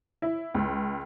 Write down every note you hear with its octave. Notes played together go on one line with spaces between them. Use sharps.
E4
C#2